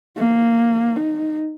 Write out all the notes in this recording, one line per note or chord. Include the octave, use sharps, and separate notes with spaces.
A#3
D#4